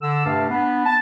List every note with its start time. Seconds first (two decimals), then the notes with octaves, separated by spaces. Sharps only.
0.02 D3 E6
0.25 G2 C3 A3 F5 A5
0.49 B3 D4
0.86 A5